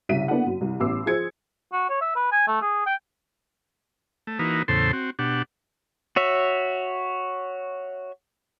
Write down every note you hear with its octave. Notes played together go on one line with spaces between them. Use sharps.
C2 C#3 E5 B6 D#7
A#3 B3 D4 E4 A4 F#5
F#2
C2
A1 B3 D6 E6 C7
F3 G#4 C5 G#6 C#7
F#4
C#5
E5
B4
G#5
A3
G#4
G5
A3
E3 A#3 D#4 F#4 B4
E2 A2 C#3 A4 C5 C6
C4 F#4
B2 D4 G4 F#5
F#4 C#5 E5